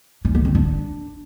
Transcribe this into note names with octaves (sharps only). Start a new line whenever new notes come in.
C#4
B3
C4
D4